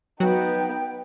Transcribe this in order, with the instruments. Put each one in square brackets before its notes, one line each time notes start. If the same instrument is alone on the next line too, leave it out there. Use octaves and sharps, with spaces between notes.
[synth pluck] F#3 F#4 [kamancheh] B3 D#4 [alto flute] G5